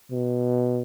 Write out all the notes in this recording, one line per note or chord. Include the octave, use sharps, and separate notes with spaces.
B2